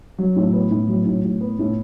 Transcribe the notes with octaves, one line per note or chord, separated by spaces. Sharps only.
F#3
A2
B3
A2
F#3
A2
A2
B3
A2